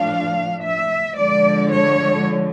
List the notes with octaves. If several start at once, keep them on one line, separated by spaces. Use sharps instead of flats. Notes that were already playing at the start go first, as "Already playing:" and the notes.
Already playing: A2 F3 A3 D4 F5
E5
D3 F3 G#3 D5
C#5